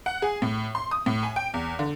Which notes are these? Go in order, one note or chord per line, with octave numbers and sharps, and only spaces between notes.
F#5
G#4
A2
C6
D#6
A2
G#5
G5
E2
D3